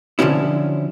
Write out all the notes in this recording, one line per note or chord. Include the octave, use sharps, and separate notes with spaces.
D3 F3 F#3 C#4 E4